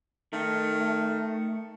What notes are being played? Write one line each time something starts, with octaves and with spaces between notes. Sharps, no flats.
D#3 A3